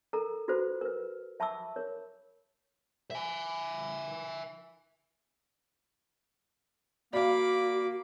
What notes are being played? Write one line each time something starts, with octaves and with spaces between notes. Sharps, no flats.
A4 A#4 A#5
F4 F#4 A4 B4 C5
A#4 B4
E5 A5 B5 C#6 D6 E6
A#4 C#5
E5 G#5
A#3 F#4 D5 F5 B5 D6